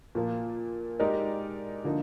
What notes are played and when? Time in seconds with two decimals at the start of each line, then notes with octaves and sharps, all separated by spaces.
0.15 A#2 F3 A#3
1.00 G#3 D#4 G4 A#4 D5
1.84 D3 F3 A#3 D#4